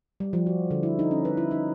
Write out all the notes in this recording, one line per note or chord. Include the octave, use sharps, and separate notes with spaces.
G3
F3
F#4
D3
E4
D#4
C#4
B4
E4
D#4